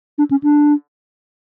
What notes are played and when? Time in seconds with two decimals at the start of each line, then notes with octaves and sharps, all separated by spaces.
0.18 D4
0.31 C#4
0.43 D4